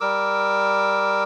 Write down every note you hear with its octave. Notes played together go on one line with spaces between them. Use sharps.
G3 A#4 D6 E6